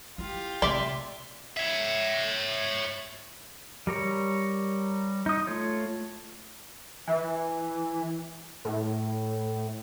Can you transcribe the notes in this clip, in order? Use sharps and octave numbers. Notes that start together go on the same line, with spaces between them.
E4 F4 G4
C3 A3 D5 E5 C6 D6
C#5 E5
G3 A#4 C#5
D#4 D#6
A3 F4 C#5
E3
A2